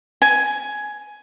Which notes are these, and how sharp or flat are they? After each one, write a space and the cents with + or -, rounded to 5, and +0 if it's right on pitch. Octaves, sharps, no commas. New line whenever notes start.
G#5 +10